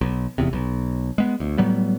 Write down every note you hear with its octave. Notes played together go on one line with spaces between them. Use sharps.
B1
F1 E2 C3
B1
G#3 B3
D2
A2 F#3 G3 B3